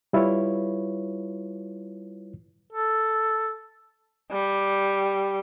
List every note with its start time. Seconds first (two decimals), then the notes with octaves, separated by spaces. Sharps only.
0.13 G3 E4 F4 B4 C#5
2.73 A4
4.31 G3